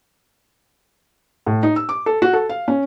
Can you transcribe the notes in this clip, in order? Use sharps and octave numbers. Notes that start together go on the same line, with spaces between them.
A2
D#4
E6
D6
A4
F#4
A4
F5
C#4